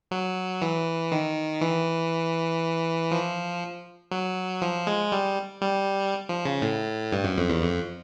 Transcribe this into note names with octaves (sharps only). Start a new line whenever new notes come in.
F#3
E3
D#3
E3
F3
F#3
F3
G#3
G3
G3
F3
C#3
A2
G2
F#2
F2
E2
F2